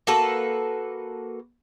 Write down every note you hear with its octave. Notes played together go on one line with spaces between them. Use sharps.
A#3 F#4 A4 B4